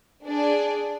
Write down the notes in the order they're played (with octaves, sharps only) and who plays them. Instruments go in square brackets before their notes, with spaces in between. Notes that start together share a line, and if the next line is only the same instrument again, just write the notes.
[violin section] D4 G#4 D5